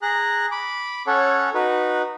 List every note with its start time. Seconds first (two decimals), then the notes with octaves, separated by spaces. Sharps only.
0.02 G#4 A#5 F#6
0.52 B5 D6
1.07 C#4 A4 C#5 F#5
1.54 D#4 F#4 B4